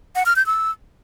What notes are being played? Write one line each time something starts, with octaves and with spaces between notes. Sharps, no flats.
F#5
F6
G6
E6